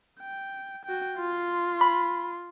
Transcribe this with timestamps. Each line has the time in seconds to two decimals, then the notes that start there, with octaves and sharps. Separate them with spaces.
0.20 G5
0.85 F#4 G5
1.17 F4 C6
1.81 B5